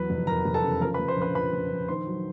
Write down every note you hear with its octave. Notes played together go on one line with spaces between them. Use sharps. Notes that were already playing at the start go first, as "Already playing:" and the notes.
Already playing: E2 F#3 B4 B5
F1
E2 A#4 A#5
F1
A4 A5
C#3
F3 A#4 A#5
B4 B5
F3
C5 C6
A#1
B4 B5
F3 B4 B5
F3
A#1
D#3 C5 C6
F#3